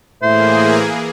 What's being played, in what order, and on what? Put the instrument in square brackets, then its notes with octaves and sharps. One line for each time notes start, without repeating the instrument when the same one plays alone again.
[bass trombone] A2 [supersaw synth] E3 A#3 G#4 [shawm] C5 [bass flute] E5